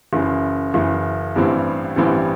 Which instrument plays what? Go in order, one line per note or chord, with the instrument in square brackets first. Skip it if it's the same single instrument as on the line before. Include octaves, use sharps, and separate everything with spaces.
[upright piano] F#1 F#2 E3
F#1 F#2 E3
A1 G2 E3 G3 C4
A1 G2 E3 G3 C4